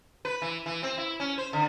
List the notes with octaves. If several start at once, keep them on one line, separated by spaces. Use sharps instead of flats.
B4
E3
E3
C4
E4
C#4
C5
D3